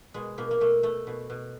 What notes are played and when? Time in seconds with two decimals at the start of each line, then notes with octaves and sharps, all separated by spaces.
0.14 B2 G#3
0.38 B2 A#3
0.51 A#3
0.60 B2 A3
0.83 B2 A3
1.07 B2
1.30 B2